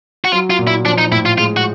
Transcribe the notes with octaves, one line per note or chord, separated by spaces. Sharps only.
F#4
F#3 F4
F4
A#2
E4
F3 D4
D#4
A2 E4
F4
G#3 F4
F#4